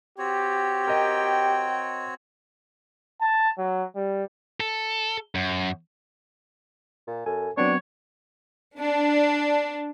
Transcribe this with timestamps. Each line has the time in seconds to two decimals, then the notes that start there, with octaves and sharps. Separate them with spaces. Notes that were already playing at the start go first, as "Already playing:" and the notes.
0.18 C4 F#4 G4 C#5
0.87 A#4 D#5 G5
3.21 A5
3.58 F#3
3.96 G3
4.60 A4
5.35 F#2
7.07 A#2
7.26 F#2 A4 G#5
7.57 F#3 B3 C4 D4 C#5
8.78 D4